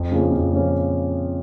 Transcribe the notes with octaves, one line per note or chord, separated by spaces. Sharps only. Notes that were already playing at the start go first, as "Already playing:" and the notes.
Already playing: F2
C#3 F3 A#3 C#4
F2
C#3 F3 A#3 C#4